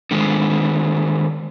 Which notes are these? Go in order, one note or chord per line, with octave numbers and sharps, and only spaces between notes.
D3 D#3 G#3